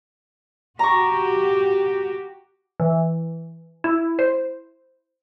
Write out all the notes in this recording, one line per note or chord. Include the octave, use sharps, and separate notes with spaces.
F#4 G4 A#5 C#6
E3
E4
C5